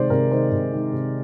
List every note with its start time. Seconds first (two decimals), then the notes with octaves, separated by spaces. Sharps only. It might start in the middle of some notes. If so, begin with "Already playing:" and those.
Already playing: C3 D#3 G#3 C5 D5
0.10 C3 A#4
0.31 D#3 G#3 C5
0.52 C3
0.72 D#3 G#3
0.93 C3